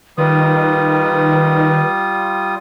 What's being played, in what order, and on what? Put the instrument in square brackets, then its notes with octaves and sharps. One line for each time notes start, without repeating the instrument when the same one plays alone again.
[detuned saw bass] D#3 [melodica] G3 F4 D#6 [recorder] B4